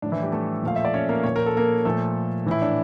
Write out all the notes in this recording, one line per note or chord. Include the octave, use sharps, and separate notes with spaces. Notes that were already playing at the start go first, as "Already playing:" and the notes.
A2 F3 D4
E3 E4
G3 G4
A3 A4
A#2 F3 F5
E5
D5
C#4 C#5
A#3 A#4
A#2 F3 C#5
A#4
A4
A#3 A#4
A#2 F3 A3 A4
A2 E3 E4
D4